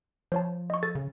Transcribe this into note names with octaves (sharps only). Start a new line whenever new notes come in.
F3 C5 C#5 A5
D#5 C#6
A4 A6
C#3